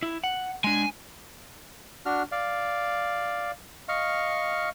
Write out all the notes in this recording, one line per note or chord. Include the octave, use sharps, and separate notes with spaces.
E4
F#5
G#3 D4 G#5
D4 F#4 F6
D5 F5
D#5 F5 C#6 F6